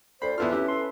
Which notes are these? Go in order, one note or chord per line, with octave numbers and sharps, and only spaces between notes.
D2 C5 D5 B5
E2 E4 F4 A4 B4 F6
C#4 E4 G4
C6